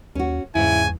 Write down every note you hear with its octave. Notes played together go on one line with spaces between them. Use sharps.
D#2 C#4 F#4
E2 G#2 C#3 E4 G#5